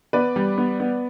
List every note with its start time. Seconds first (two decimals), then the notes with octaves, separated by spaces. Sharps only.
0.13 B3 B4 D5
0.36 G3
0.58 B3
0.80 B3